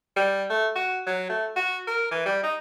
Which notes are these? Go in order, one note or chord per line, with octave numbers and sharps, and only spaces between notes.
G3
A3
F#4
F#3
A3
F#4
A#4
E3
G3
D#4